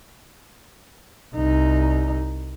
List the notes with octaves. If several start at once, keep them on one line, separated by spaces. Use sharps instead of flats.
C2 D#4